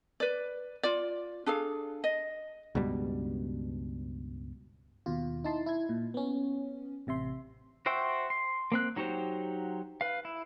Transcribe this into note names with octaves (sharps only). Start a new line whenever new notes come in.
B4 D5
F4 D5
D4 G#4 A4 F5
D#5
C#2 G2 B2 G3
D#2 B2 F4
D#4 E4 A5 C6
E4 G#6
A#2
B3 C#4
A1 C3 E5 C6
F#4 C5 E5 G5
C6
A#3 C4 F#6
F#3 D#4 F#4 G4 C5
B4 F5
E4